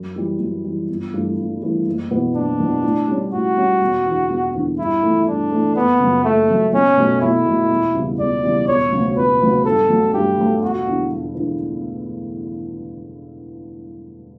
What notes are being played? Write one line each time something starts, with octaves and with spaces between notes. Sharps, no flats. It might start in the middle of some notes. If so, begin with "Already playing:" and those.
Already playing: F#2
E3 G3
F#2
E3 G3
G1
G2 E3 A3
G1
G2 E3 A3
F#1
E2 B2 F#3 B3
F#1 D4
E2 B2 F#3 B3
A2
G3 C#4
A2 F#4
G3 C#4
E1
E2 D3
E1
E2 D3
G2 E4
E3 A3
G2 D4
E3 A3
F#1 B3
F#2 C#3
F#1 A3
F#2 C#3
B1 C#4
B2 F#3 A3
B1 E4
B2 F#3 A3
E1
E2 C#3 G3
E1 D5
E2 C#3 G3
E1 C#5
D2 C#3 F#3
E1 B4
D2 C#3 F#3
G2 A4
F#3 A3
G2 G4
F#3 A3
E1 F#4
E2 D3
E1
E2 D3